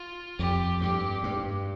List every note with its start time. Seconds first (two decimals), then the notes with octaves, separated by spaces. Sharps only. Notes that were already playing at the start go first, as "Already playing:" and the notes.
Already playing: F4
0.39 F2 G4
0.81 G2 G4
1.24 G2